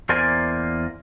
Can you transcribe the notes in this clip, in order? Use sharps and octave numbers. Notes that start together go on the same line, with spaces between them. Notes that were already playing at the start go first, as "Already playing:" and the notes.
E2 A#3 A#4 C5 D5 G#5